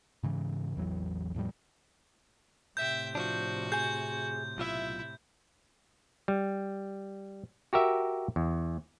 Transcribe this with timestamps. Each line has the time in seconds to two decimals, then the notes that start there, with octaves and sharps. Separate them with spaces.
0.23 G#2 C#3 E3
0.76 A1 E2 E3 F#3
1.34 E2 A2 F3 G3
2.77 A2 C3 E5 G5 G6
3.15 F3 D4 F#4
3.72 G#4 G#5 G6
4.58 B1 E4 F4 E5
6.28 G3
7.73 F#4 G4 A#4 E5
8.36 E2